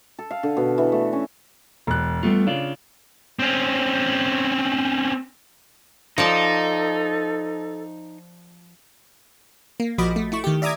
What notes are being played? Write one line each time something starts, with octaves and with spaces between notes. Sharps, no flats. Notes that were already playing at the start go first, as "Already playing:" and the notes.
A4
F5
D3
B2
E3
A3
C#4
E1 F#6
G3 A3 B3 F4
C#3 D4 F4 D5
C4 C#4
F3 D#4 A4 D5 A5
A#3
A#1 F3 F#4 D#5 B5 D6
A3
A3 E4 C#6
D#3 G4
D5 E5 A#5 D6 D#6 G#6